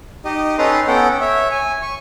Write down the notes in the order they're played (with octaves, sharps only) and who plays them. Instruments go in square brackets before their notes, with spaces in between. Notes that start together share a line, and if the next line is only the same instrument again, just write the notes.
[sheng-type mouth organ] D#4 G4 D#5
C#4 D#4 A4 B4 A#5 C6
B3 C#4 A4 F#5 G5
C#5 E5
G#5
C#6